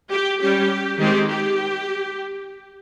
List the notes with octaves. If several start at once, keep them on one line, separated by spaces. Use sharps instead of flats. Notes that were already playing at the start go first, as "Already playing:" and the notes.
G4
G3 C#4 G4
D#3 G#3 C4 G4
G4